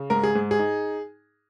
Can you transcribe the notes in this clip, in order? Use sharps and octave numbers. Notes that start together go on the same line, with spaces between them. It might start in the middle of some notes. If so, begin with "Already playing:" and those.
Already playing: C#3
G#2 A#4
G#4
G#2
G#4
D#4